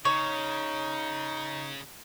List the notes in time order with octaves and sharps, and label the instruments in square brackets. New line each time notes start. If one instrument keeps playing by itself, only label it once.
[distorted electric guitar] C#3 [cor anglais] D#4 [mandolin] C#5